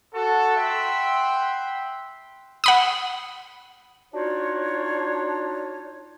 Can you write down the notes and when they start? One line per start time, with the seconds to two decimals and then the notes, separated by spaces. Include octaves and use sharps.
0.14 F#4 A4
0.57 E5 F#5 G5 B5 C6
2.64 F#5 B5 D#6
4.12 D4 D#4 F4 F#4 C#5